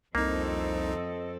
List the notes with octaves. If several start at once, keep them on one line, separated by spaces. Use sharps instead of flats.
C2 F2 A#3 C4 D#4 A4 D#5
D#5